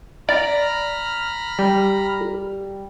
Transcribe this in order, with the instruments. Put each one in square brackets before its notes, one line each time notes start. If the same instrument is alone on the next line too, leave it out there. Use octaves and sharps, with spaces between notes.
[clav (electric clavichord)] D5 [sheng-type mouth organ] A#5 B5 F6
[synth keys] G3